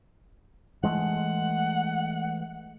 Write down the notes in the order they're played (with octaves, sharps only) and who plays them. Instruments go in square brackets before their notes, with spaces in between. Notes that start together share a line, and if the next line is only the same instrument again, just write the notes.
[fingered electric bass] E3 G#3 A3 [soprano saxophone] F#5